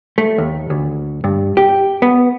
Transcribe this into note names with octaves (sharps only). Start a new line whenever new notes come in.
A3
D#2
D2
G2
G4
B3